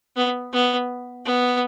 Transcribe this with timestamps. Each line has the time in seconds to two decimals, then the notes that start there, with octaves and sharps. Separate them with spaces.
0.16 B3
0.53 B3
1.26 B3